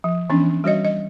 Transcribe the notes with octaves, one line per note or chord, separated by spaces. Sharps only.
F3
E3 B3 C#4 D4
G3 F#4 C#5 D#5
D#5